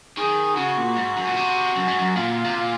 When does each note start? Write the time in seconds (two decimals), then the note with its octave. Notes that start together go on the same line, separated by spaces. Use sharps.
0.17 D#3 G#4
0.57 C#3 F#4
0.77 A#2
0.97 G#2
1.17 F#2
1.27 A#2
1.37 C3
1.76 F#2
1.88 G#2
2.00 F#2
2.15 A#2 F4
2.44 C3
2.55 A#2